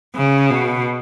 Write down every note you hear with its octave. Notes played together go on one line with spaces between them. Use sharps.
C#3
B2